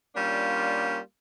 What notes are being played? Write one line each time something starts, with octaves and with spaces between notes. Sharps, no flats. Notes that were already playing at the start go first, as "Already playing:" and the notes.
G3 A#3 C#4 D4 F4